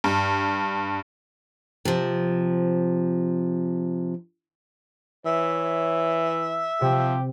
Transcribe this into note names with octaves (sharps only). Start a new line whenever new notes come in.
G2
C3 F3
E3 C#5 E5
C3 F3 G4